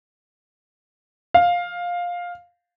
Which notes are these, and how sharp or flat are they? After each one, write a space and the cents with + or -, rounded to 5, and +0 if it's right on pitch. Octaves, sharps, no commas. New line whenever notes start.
F5 +10